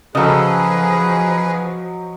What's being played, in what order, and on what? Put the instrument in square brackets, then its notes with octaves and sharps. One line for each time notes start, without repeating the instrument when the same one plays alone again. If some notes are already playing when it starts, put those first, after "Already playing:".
[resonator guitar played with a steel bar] C#3 A4 [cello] F3 [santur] F#3 D#5 [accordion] G#4 B4